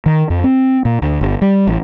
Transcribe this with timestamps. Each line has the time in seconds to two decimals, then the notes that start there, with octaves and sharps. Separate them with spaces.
0.06 D#3
0.30 F2
0.44 C4
0.85 A#2
1.02 D2
1.21 G1
1.42 G3
1.67 A1